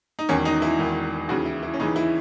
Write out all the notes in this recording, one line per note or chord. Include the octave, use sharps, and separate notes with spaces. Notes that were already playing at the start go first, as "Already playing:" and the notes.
D#4
E1 E2 D#3 C#4
D#4
E4
E1 E2 D#3
D#2 C#3 E3 F#4
E4
E4
C#4
D#2 C#3 E3 D#4
E4